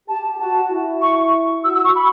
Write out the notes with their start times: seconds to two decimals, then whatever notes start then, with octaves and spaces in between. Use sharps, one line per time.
0.08 G4 A5
0.39 F#4 A5
0.71 E4
1.02 C#6
1.64 F#4 E6
1.75 E6
1.85 C#6
1.95 B5